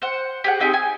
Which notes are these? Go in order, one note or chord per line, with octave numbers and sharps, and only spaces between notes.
C5 F#5
G4 G#4 F#5
C4 D#4 G4 G#4
G#5